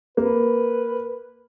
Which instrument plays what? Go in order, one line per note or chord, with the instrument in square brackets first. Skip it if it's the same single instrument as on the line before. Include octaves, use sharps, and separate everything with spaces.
[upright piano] A#3 [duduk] B4